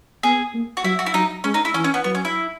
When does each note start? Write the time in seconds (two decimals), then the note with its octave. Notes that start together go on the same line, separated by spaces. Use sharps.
0.23 B3 G#4
0.54 A#3
0.77 F#4
0.84 F#3 E4
0.99 F#4
1.06 E4
1.14 F#3 D#4
1.44 G#3 C#4
1.54 D#4
1.65 E4
1.74 E3 C#4
1.84 C#4
1.94 B3
2.04 F#3 B3
2.15 C#4
2.25 E4